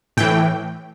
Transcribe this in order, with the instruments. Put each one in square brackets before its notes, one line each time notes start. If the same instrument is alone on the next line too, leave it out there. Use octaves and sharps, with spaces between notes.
[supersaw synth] A2 E3 G5